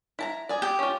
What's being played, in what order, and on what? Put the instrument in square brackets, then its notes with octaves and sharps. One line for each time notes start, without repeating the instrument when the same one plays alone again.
[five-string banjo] E4 A5 A#5
G#4 D5
[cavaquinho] G4
[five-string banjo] C#4 F4